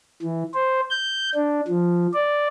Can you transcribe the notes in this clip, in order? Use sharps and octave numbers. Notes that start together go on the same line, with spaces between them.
E3
C5
G6
D4
F3
D5